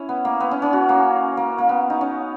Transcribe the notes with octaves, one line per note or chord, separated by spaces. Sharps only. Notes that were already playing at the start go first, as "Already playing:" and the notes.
Already playing: C#4 E4
B3
A#3
B3
C#4
C#4
F#4
A#3
A#3
A#3
B3
D#4
C#4